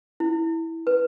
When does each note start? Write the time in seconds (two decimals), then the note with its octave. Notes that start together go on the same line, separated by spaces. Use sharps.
0.20 E4
0.87 B4